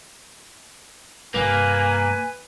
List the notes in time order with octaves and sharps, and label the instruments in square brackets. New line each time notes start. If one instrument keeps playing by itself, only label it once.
[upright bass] G2 C3 [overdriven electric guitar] A#3 [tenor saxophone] B4 [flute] G#5